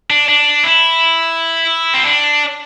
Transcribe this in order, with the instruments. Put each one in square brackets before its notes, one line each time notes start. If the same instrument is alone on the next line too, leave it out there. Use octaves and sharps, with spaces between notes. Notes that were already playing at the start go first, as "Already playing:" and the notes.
[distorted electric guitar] D4
D4
E4
C4
D4